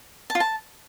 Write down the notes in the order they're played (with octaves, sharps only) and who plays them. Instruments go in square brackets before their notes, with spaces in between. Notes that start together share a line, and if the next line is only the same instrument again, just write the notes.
[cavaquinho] A5
F4
A5